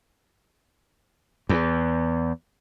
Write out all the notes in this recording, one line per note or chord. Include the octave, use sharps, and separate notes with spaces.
E2